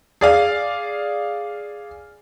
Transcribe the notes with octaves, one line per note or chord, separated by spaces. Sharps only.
G#4 D5 F5